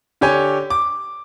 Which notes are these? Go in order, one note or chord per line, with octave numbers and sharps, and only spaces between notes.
D3 G4 C#5 G#5
D6